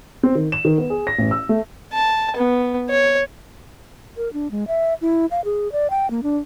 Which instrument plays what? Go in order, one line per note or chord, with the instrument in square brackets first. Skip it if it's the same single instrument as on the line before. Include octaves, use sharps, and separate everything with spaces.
[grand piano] C4
D#3
E7
D#3
B3
G#4
A#6
A1
E6
A3
[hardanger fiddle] A5
B3
C#5
[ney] A#4
D4
G#3
E5
E4
F5
G#4
D5
G5
A#3
D4